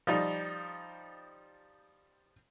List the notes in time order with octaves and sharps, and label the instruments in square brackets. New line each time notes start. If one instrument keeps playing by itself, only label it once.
[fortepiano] F3 G3 D#4